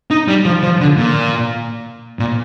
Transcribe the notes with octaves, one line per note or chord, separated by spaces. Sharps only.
D#4
G3
F3
F3
D3
A#2
A#2